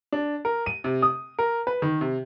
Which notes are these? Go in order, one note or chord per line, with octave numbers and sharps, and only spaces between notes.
D4
A#4
D#7
C3
D#6
A#4
B4
D#3
C3